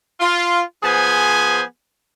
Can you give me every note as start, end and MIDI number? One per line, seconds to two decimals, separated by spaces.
0.20 0.61 65
0.82 1.61 53
0.82 1.61 59
0.82 1.61 68
0.82 1.61 72
0.82 1.61 80